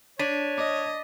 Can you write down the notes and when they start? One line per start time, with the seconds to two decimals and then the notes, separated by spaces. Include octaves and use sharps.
0.19 D4 C#5 A6 B6 D#7
0.58 D#5 D6